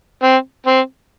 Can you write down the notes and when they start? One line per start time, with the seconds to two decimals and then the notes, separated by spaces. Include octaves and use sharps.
0.23 C4
0.67 C4